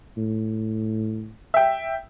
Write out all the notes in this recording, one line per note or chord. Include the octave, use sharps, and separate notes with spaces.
A2
E5 G5